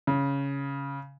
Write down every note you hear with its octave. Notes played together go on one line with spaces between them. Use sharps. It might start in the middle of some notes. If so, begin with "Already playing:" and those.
C#3